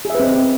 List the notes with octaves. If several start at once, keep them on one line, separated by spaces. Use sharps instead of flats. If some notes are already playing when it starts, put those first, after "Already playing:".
C4 G#4 B4 D#5 E5